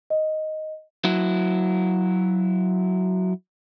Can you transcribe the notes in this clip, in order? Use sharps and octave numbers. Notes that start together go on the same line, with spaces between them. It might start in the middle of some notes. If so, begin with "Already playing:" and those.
D#5
F#3 E4